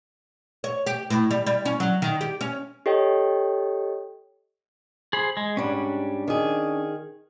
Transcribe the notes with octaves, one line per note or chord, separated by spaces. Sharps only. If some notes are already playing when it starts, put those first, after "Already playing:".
C#5
G4
A2
G3
G3
C#4
F#3
D#3
G4
C#4
G4 A4 C#5 D#5 G5
G#4 C5 B5
G#3
G#2 G3 C#4 D4
D#3 G#4